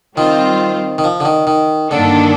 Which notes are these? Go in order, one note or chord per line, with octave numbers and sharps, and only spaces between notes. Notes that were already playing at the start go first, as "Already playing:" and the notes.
D#3 G3 C4 F4 C5
D#3
F3
D3
D#3
D#3
G2 D3 D#3 A#3 D4 A4